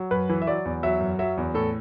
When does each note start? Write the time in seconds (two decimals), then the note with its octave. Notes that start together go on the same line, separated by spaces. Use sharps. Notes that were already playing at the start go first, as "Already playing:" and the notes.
Already playing: F#3
0.11 F#2 B4
0.29 E3
0.42 E5
0.47 F#3 D5
0.65 E2
0.83 F#3 E5
1.00 F#2
1.19 F#3 E5
1.37 E2
1.54 A2 A4